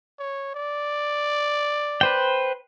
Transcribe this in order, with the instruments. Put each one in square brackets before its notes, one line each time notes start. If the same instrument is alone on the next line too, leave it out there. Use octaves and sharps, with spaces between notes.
[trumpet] C#5
D5
[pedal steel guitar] B4 C5 G5